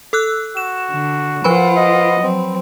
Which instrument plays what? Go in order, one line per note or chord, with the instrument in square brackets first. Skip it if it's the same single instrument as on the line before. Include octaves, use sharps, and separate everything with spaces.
[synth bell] A4 E6 F#6
[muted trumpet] F#4 [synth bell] E7
[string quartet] D3
[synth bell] F3 B4 B5 [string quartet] F4 C5 F#5
[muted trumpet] D#5
[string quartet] F#3 C4